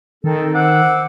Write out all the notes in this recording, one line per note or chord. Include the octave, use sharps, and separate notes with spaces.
D#3 C4 A4
C5 F#5 D6 E6